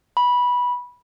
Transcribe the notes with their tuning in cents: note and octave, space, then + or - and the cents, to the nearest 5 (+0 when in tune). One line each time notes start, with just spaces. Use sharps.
B5 -15